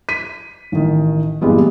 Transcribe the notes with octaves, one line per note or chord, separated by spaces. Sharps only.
B6 D#7
A1 D#3
G2 A#2 E3 G3 G#3 B3